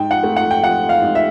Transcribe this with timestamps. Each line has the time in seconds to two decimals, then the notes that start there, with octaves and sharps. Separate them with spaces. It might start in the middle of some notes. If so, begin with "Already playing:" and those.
Already playing: G#2 G5
0.11 F#5
0.24 A3
0.36 F#5
0.51 G5
0.63 F3 F#5
0.89 F5
1.02 G#2
1.15 E5